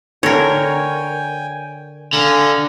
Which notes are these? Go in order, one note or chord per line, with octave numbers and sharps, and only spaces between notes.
D3 A#4 C#5 G5 G#5
D3 F5 G#5 A#5